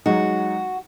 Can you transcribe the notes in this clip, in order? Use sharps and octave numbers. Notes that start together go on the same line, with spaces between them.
F#3 G#3 D#4 F#4